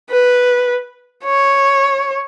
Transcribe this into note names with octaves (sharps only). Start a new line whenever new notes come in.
B4
C#5